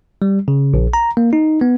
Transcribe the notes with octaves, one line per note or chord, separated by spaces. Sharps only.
G3
C#3
A#1
A#5
A#3
D#4
B3